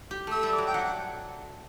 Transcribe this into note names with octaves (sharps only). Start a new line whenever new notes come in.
G4
A3 E6
G3
F#3 D6
G5
F#3 F#5